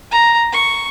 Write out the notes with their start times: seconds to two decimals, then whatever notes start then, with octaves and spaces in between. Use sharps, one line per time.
0.12 A#5
0.53 C#6